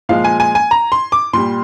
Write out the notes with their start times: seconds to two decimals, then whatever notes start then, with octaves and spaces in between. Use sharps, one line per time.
0.09 A#2 F3 G#3 F5
0.24 G#5
0.40 G#5
0.55 G#5
0.71 A#5
0.92 C6
1.12 D6
1.33 A#2 G3 C6